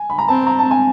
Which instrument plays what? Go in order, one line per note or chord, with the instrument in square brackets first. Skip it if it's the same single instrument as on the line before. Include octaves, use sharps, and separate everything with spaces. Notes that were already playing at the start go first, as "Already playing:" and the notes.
Already playing: [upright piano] G#5
B5
A#5
[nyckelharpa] C4 [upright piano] A5
[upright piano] A#5
A5
G#5